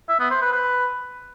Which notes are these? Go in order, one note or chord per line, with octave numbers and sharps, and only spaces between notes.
E5
B3
C5
B4
B4